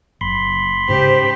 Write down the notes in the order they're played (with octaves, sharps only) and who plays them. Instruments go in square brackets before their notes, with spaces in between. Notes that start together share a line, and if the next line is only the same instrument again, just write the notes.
[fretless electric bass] F#1 [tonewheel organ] B5 C6
[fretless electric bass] G#2 C#3 [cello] G4 [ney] C5